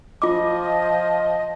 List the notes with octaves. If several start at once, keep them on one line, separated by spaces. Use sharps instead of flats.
F3 F4 D#5 D6